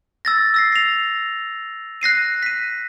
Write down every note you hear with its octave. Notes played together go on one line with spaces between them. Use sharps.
E6 A6 A#6
E6 A#6 C7
C7 F7
F#6 A#6 C7 D#7
B6 D#7